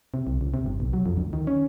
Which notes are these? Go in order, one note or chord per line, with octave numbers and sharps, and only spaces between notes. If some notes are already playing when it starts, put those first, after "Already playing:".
C3
C2
C#2
C3
G1
B1
F#3
F2
D2
D#3
C#4